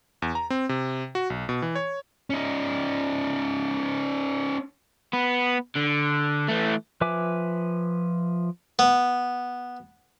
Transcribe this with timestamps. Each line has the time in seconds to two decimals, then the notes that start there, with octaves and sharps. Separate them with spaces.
0.22 E2
0.35 A#5
0.50 C4
0.69 C3
1.15 F#4
1.30 B1
1.49 B2
1.62 E3
1.75 C#5
2.30 C#4 D#4
5.13 B3
5.76 D3
6.49 E3 A3
7.01 F3 B4 E5 G#5 D6
8.79 B3